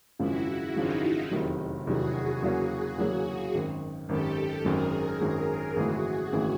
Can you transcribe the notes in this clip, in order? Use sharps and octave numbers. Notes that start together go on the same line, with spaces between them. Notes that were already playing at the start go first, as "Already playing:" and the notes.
G#1 F#2 C#3 F3 G#3 E4 F#4
G#1 F#2 C#3 F3 G#3 D#4 F4
F1 E2 C3 D#3 F#3
F1 E2 C3 D#3 F#3 F#4 G#4
E2 C#3 F#3 A#3 C#4
E2 C#3 F#3 A#3 C#4
G#1 F#2 D#3
G#1 F#2 D#3 G4 A4
G#1 F#2 D#3 F#3 G#4 A#4
G#1 F#2 D#3 F#3 G#4 A#4
G#1 F#2 C#3 E3 A3 F#4 G#4
G#1 F#2 C#3 E3 A3